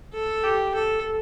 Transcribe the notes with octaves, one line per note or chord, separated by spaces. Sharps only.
A4
G4
A4